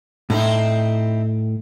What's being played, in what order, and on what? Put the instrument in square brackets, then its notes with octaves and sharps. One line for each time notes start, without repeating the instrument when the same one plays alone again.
[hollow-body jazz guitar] A2 [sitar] C4 D#4 E4